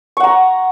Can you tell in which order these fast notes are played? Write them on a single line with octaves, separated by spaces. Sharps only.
C#6 F#5 A#5